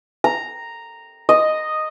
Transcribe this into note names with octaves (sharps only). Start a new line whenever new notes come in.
A#5
D#5